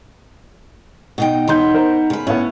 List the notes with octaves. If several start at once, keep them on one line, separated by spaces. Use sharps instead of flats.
B2 D#4 G5
E1 B3 D#4 C6 G6
A#4 C5
C#3 B4
A2 B3 C#4